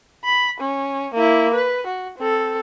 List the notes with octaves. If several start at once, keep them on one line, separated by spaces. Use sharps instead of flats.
B5
C#4
A#3 E4
B4
F#4
C4 A4